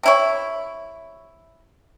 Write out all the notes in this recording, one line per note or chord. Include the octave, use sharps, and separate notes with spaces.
C3 E4 C#5